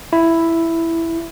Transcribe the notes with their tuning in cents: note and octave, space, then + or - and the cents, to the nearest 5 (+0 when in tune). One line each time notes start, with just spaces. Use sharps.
E4 +5